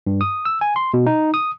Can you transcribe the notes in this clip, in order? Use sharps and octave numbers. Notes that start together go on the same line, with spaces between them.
G2
D#6
E6
G#5
C6
B2
D#4
D#6